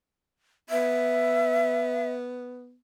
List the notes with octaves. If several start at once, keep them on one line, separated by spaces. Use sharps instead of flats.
B3 E5